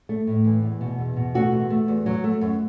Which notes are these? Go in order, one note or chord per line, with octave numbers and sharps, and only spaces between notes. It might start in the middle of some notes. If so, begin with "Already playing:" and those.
A3
A2
E3
E2
B2
E2
B2
A3 F#4
E2
A3
E2
F#3
A3
F#2